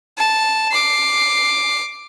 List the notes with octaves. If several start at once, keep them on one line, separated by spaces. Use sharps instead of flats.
A5
D6 C7